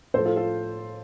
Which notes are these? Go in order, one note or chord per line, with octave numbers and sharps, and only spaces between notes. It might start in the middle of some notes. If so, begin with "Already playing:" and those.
A2 F3 A4 C5
F4 A4
F4 A4